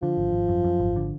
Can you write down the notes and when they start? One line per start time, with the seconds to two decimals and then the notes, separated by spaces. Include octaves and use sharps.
0.02 D3 F3
0.17 G#1
0.33 G#1
0.49 F#2
0.64 F#2
0.80 G#1
0.96 D3